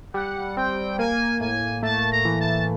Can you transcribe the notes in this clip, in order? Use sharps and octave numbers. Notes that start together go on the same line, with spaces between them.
G3 F#5
C4 G5
A#3 G#5
A2 G#5
A3 A5
A#5
E3
A5